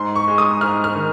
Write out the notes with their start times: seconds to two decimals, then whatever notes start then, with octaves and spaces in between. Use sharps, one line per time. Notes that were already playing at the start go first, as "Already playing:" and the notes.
Already playing: G#2 C6
0.16 C#6
0.28 G#3
0.38 D#6
0.61 G#2 F6
0.84 F6
0.95 D#3